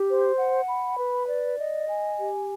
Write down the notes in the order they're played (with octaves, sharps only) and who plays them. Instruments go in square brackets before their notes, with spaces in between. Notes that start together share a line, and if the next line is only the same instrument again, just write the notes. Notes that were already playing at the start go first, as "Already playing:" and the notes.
Already playing: [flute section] G4
C5
F#5
B5
B4
D5
D#5
G#5
G4